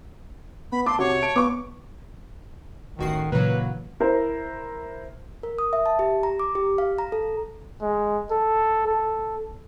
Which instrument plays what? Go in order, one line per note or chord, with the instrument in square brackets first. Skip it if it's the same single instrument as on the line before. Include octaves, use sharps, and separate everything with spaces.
[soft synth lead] B3 [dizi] B5
[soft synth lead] A5 [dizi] C6 [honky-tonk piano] D6
[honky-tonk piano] C3 [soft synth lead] F#4 [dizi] C#5
[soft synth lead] A5 [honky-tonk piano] D7
[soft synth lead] B3 [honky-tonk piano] C#6 D6
[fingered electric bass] D1 [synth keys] A1 F#4 C7 [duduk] D#3
[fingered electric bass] A#2 C#3 E3 [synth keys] F#3 A#3 [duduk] B4
[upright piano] E4 A#4 C5
[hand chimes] A#4
D#6
E5
A5
G4
A#5
D6
G4
F5
A#5
A4
[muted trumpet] G#3
A4
A4